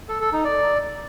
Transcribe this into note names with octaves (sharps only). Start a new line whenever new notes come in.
A4
A4
D#4
D5